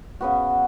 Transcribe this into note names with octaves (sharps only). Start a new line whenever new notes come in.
C#3 B3 F#4